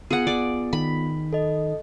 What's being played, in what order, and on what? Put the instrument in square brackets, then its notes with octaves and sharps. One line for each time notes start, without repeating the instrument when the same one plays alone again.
[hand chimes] B3 F4 [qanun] G#4 F#5
[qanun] D5
[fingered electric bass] D#3 [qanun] B5
[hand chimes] A4 D#5